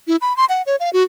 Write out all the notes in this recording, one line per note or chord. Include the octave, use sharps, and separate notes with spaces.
E4
B5
C6
F#5
C#5
F5
F#4